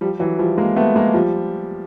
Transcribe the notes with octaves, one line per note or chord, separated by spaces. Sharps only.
F3 G3
E3 F#3
F3 G3
G#3 A#3
A3 B3
G#3 A#3
F3 G3